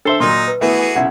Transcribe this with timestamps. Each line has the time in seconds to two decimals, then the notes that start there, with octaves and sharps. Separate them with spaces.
0.05 D4 A4 C5 E5 C7 G7
0.20 A#2 F#3 D#4 C6
0.48 B4
0.61 E3 A3 B3 E4 F#4 G#4 A4 B4
0.96 B1 C#3 E4 F#5 G#6